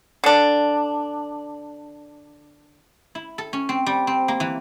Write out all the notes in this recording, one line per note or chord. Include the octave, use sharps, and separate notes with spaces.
D3 D4
E4
A4
C#4
C4
G3
C4
A#3
E3